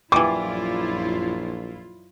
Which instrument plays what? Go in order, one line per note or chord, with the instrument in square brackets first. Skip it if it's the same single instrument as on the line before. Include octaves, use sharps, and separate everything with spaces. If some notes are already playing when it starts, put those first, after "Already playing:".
[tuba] A#1 [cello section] F#2 E4 F4 [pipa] E3 G3 [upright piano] D6